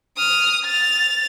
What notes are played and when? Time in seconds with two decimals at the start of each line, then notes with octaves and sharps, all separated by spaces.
0.17 D#6 F6
0.65 A6 F7